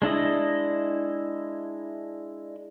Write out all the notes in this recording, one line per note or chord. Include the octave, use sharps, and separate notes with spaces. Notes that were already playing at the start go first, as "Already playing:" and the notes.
G#3 D4 E4 D#5